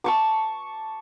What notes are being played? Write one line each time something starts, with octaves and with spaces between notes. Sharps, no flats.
A5 C#6 D6